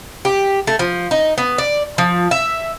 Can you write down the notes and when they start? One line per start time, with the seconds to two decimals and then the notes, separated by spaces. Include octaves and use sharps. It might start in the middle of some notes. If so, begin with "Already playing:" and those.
0.25 G4
0.67 A3
0.79 F3
1.11 D#4
1.38 B3
1.58 D5
1.98 F3
2.31 E5